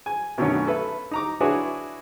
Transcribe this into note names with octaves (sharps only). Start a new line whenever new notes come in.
G#5
F#2 B2 D3 D#3 A3 C#4
A4 B4 E5
D#4 A#5 D6
D4 E4 F#4 G#4 B4 C#5